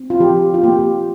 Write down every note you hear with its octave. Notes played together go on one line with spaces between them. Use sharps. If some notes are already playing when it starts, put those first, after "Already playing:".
Already playing: C4
F4
F3 G4
F4
A#3 G4